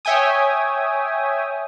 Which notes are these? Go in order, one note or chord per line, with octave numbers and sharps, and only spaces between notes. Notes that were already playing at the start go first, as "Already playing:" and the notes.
C#5 E5 G5 G#5 D#6